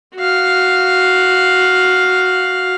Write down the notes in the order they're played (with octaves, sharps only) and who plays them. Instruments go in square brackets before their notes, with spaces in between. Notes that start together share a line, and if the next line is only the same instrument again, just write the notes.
[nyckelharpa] F#4 F5